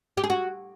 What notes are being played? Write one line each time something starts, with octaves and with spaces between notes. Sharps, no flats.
G4
G#4
F#4